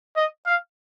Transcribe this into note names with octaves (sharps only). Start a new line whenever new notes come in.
D#5
F5